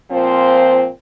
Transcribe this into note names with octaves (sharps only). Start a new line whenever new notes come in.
A#2 F3 C4 C5